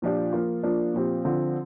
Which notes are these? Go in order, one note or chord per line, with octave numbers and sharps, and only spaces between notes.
A#2 F3 D4 G4
F3 A#3 F4
F3 A#3 D4
A#2 F3 C4 G4
D3 F3 C4